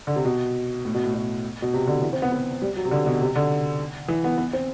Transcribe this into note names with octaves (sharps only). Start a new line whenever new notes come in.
D3
C3
B2
A2
B2
A2
B2
B2
C3
D3
E3
C4
B3
B3
G3
F#3
C3
D3
B2
C3
D3
E3
B3
B3
C4